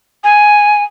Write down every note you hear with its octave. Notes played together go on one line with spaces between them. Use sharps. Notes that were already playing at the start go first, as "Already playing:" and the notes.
G#5